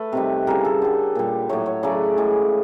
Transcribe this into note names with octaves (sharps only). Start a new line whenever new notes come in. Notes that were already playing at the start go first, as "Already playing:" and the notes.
Already playing: A3 B4
C3 D#3 G3
C#3 E3 G3 A#4
A4
D3 G3
A#2 G3
A2 F#3 A3 C#5
C#5
C#3 F#3 A3 D5
A2 E3 G#3